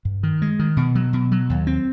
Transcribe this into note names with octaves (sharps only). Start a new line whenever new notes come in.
G2
D#3
G#3
D#3
B2
F#3
B2
F#3
D#2
C4